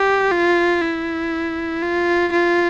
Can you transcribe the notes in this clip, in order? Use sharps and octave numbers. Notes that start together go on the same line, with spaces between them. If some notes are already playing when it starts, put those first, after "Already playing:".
Already playing: G4
F4
E4
F4
F4